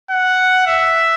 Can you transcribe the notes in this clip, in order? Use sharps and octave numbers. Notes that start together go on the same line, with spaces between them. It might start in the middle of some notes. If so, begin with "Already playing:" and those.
F#5
E5